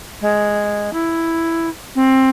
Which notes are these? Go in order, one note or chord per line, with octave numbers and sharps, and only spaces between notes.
G#3
E4
C4